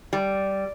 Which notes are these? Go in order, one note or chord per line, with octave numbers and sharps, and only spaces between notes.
G3